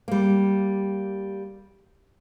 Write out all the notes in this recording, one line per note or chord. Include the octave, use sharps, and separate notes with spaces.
G3 A#3